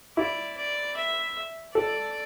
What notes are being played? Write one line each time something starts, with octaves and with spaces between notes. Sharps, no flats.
E4 D5
D5
E5
A4 D5